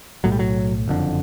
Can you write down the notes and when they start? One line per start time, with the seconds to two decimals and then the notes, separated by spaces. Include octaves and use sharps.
0.24 B1 A2 F#3
0.32 G3
0.39 F#3
0.88 F#1 F2 D3